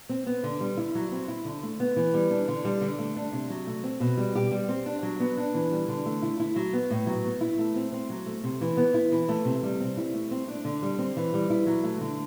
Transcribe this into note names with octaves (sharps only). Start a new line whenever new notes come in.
C4
B3
D3
G3
E4
F#3
C4
E4
D3
A3
B3
E3
G3
D4
D3
G3
D3
A3
D4
C3
F#3
A3
C4
B2
G3
G4
G3
C4
D4
F#3
B3
D4
E3
G3
D3
A3
E4
E4
F#3
B3
A2
F#3
B3
E4
A3
C4
C4
F#3
A3
C3
E3
B3
E4
E3
A3
C3
G3
C4
E4
A3
C4
D4
D3
G3
C4
E3
G3
E4
F#3
A3
D3